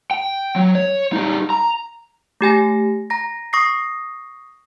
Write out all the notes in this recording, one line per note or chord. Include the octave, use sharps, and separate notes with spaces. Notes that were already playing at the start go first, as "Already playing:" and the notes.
G5
F#3
C#5
G3 D#4
A#5
A3 G4 G#5 A#6
A#5 A#6
C#6 D#6 A#6 C7